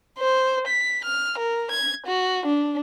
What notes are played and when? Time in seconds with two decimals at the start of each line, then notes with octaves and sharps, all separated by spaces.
0.19 C5
0.67 B6
1.05 F6
1.38 A#4
1.71 G#6
2.07 F#4
2.46 D4